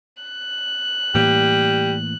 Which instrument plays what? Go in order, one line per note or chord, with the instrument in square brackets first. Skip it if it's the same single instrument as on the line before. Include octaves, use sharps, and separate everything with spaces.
[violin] F#6
[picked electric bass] A2 E3 A#3 [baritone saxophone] G3